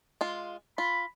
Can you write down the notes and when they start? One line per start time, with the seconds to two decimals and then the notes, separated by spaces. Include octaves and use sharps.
0.21 G#3 F4
0.78 F4 B5